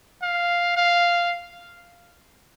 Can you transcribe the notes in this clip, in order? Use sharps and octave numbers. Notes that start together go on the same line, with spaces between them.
F5
F5